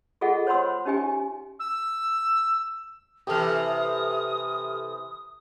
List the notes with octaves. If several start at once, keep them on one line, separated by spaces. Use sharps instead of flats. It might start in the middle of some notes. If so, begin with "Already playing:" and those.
F4 G#4 A4 D#5 F#5
C5 C#5 F#5 B5 C6 E6
C#4 D#4 G4 E5 G#5
E6
C3 E3 G4 A4 D#6 F6